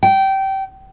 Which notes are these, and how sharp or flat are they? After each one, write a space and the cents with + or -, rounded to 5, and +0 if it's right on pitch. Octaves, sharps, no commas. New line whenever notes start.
G5 -20